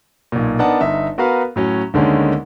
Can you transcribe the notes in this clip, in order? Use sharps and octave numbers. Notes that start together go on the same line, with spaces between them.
B1 A#2
B3 D4 D#4 A#4 F#5 A5
G1 D#4 E5
B3 F#4 A#4 B4 F5
A2 F#3 C#4
D2 D3 D#3 G#3 A#3 C#4